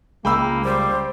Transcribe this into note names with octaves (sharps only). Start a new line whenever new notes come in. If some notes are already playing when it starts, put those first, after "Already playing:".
C#2 G#3 A#3 G5 B5 E6
G3 C5